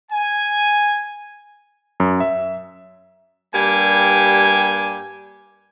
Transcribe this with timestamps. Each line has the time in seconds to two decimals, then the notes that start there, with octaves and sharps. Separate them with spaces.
0.12 G#5
2.00 F#2
2.20 E5
3.54 G2 G3 A#3 G4 G#5